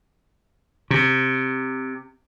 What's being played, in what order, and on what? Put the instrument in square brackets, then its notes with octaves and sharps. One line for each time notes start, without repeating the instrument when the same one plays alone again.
[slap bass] C3